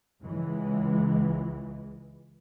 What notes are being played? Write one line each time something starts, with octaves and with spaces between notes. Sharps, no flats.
C#2 E3 G#3